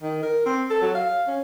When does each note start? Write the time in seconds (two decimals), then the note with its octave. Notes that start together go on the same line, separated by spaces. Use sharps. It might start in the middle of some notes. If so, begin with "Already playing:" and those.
0.02 D#3
0.22 A#4
0.46 C4
0.70 A4
0.82 F#3
0.94 F5
1.27 C#4